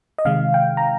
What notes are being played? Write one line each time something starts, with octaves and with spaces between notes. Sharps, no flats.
D#5
C3 D#3 G#3 F5
G5
A#5